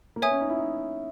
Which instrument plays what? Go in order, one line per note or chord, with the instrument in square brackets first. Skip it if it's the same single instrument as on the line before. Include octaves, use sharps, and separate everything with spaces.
[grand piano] A#3
[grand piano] B3 [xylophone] C#5 E5 G#5 D#6
[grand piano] C#4
D#4
E4
D#4